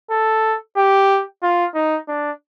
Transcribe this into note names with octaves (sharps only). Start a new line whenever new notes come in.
A4
G4
F4
D#4
D4